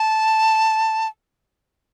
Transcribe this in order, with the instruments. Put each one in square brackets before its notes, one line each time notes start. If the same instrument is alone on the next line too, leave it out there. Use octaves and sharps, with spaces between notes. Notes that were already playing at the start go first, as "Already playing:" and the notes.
Already playing: [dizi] A5